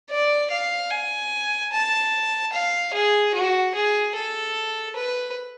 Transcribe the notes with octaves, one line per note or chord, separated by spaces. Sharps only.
D5
F5
G#5
A5
F5
G#4
F#4
G#4
A4
B4